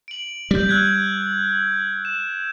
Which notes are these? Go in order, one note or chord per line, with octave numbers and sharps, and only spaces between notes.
D7 F#7
G3 G6 F#7
E6 F#6 G#6
E7